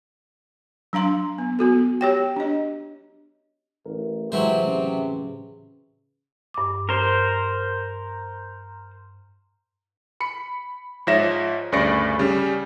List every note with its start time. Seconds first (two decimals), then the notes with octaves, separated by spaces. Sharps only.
0.93 F#3 D4 F5 A#5 C6
1.38 B3
1.59 B3 F#4 A4
2.01 G4 C#5 G5
2.36 D4 D#5
3.86 A1 A#4
4.32 A2 C3 E3 F#3 G#3 E4 B4 C5
4.66 C#3
6.54 G2 D6
6.89 A#4 C5
10.20 B5 C#7
11.07 G#2 F3 C#5 E5 A#6 E7
11.72 D2 G2 C#3 D5 A#6 C#7
12.19 C#3 G3